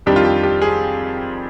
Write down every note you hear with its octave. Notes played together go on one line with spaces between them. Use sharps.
F2 D#3 G3 D4 G4
F4
G4
G4
G#4